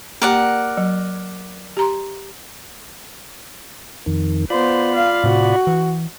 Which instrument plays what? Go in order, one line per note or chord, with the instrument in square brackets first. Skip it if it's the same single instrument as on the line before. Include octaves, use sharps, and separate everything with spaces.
[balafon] A#3 G4 G5 [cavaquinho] A#4 D5 F#5
[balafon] F#3
G4 A#5 C6
[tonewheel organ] F2 D#3
[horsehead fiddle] B3 C5 [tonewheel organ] F4 D5 B5
[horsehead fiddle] F5
[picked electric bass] A2 C3 [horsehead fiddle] F#4
[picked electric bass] E3